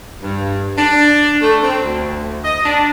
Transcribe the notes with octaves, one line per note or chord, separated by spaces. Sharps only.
G2
D4
A3
C4
D2
D#5
D4